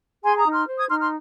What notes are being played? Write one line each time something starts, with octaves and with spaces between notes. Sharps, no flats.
G#4 G#5 C6
A#5 D#6
D#4
C6 F6
C5
D#6 G#6
D#4 C6 F6
C6 F6